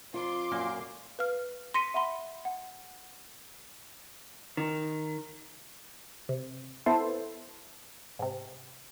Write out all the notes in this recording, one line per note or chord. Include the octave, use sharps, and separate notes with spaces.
F2 F4 C6 D6
F#2 A#2 A#3
B4 F5 F6
C6 A#6 B6 C#7 D#7
E5 F#5 B5 C6
F#5
D#3
C3
B3 E4 A4 C5
G#2 C3